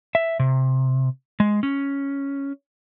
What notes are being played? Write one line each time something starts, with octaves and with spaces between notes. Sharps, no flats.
E5
C3
G#3
C#4